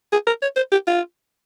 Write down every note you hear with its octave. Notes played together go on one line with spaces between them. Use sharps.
G#4
A#4
C#5
C5
G4
F4